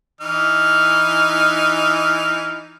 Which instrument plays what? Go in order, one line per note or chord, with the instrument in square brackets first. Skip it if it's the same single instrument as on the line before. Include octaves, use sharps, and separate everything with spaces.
[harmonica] E3 D#4 F6